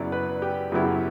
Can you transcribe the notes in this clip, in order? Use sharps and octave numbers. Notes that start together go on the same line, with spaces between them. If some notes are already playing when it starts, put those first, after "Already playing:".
Already playing: F#2 C#3 F#3 B3 E4 D5
B4
G4
F#2 C#3 F#3 B3 E4 G4